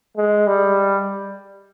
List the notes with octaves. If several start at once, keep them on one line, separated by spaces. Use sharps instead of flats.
G#3
G3